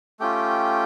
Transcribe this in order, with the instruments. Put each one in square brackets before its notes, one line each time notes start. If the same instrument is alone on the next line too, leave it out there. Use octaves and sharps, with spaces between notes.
[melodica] A3 C#4 F4 G4 G5